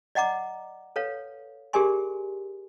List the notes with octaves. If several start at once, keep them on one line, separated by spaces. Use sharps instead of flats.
D5 D#5 F#5 A#5 D6
A4 B4 C#5 F5
G4 G#4 A#4 D5 G#5 C6